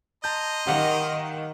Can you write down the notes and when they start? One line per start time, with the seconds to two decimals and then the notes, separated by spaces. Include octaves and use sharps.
0.24 D#5 A5 A#5 C6 G6
0.67 D#3 G4 F5 F#5